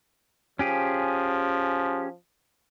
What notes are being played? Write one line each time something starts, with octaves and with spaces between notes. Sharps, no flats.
F3 C#4 G4 G#4